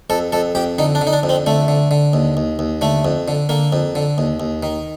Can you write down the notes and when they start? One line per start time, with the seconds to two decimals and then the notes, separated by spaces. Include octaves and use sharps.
0.10 F2 A4
0.32 F2 A4
0.55 F2 G4
0.78 D3 D#4
0.95 D4
1.01 D3
1.07 D#4
1.13 D4
1.23 F2
1.29 C4
1.46 D3 A3
1.68 D3
1.91 D3
2.13 D#2
2.37 D#2
2.59 D#2
2.81 D3 A3
3.05 F2
3.28 D3
3.49 D3 A#3
3.73 F2
3.95 D3
4.18 D#2
4.40 D#2
4.63 D#3